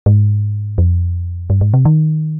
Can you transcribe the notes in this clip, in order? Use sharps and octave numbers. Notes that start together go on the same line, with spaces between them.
G#2
F2
G2
G#2
C3
D#3